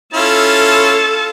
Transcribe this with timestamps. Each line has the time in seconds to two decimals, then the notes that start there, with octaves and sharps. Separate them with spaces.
0.14 C#4 E4 F4 A4 A5